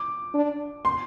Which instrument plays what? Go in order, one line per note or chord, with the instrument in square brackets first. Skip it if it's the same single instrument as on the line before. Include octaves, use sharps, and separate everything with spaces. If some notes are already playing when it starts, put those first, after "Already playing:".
Already playing: [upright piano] D6
[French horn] D4
[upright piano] C6